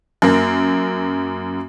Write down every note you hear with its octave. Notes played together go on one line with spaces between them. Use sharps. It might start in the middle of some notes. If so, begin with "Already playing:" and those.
F#2 A#3